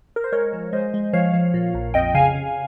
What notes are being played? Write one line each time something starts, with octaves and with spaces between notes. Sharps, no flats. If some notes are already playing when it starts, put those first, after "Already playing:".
A#4
C5
G#3 A#4 C#5
F3
G#3 C5 D#5
G#3
F3 C#5 F5
F3
A#2
A#1
F2 D#5 G5
C#3 F5 G#5
C#3